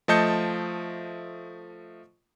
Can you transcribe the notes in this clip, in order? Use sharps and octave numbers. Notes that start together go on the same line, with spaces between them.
F3 A3 D#5 A5 G6 C#7